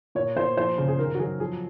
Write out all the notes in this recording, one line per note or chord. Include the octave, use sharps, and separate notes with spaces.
A#2 C#5
A#2 C5
F3 C5
C#3
G#4
D#3 A#4
F#4
F#3 G#4
F3 G#4